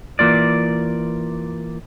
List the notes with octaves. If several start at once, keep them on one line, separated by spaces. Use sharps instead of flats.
E3 A#3 F4 D5